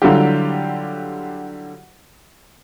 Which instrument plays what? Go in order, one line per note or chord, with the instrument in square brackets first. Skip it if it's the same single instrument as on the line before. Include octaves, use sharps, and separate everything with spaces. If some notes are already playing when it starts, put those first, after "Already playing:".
[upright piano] D3 F#3 G3 E4 F4 G4